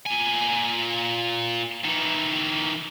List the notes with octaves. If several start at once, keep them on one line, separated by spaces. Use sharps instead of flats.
A#2 G#5
D#3 E3